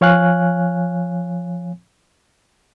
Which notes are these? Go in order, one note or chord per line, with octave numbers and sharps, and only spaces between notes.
F3 C#5 F5 G#5 F#6